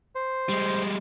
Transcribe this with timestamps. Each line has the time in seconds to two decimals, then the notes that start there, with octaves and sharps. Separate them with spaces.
0.15 C5
0.49 G3 G#3